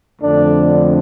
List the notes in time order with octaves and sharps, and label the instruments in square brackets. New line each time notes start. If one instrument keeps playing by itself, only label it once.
[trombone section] F2 D3 A3 D4